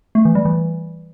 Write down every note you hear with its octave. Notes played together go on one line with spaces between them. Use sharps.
A3
E3
G3
E3